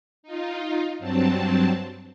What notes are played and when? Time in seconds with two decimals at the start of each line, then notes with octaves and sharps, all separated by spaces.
0.23 D#4 F4
0.99 G2 F#3 C4 A5